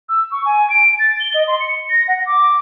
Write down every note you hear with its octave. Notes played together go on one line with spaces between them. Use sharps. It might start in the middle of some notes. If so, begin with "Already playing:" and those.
E6
C#6
G#5
D7
A6
G7
D#5
C6
C#7
A#6
F#5
D6